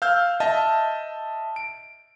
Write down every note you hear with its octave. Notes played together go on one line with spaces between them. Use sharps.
F5 E6 F6 G6
D#5 E5 A5
D7